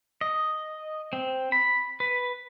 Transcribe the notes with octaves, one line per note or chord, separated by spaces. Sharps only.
D#5
C4
B5
B4